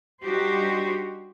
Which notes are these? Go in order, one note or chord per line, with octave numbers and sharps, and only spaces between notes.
G3 D4 D#4 F#4 G4 C5